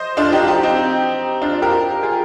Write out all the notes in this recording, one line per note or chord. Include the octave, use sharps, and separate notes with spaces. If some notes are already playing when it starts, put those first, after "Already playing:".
Already playing: C5 D#5
D4 F4
D#4 G4
D#4 G4
C4 D#4
D4 F4
G4 A#4
F4 G#4